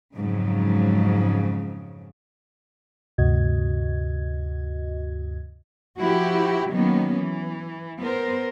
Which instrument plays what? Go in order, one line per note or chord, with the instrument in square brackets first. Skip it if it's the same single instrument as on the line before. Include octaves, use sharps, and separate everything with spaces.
[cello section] F2 G#2 C#3 F#3
[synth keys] D2 G2 C3 F#4 D#5 G#6
[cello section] F3 E4 F#4 G4
D#3 F#3 A#3 B3 C#4
E3
B3 A#4 C5